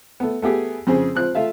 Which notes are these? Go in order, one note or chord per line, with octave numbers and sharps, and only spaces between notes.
A3 B3
A3 B3 G4 G#4
F2 C#3 C4 G#4
F3 C4 F#6
A3 F4 E5 F5